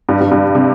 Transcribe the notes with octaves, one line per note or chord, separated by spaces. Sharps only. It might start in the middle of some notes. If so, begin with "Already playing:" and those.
G2
G2
G2
C3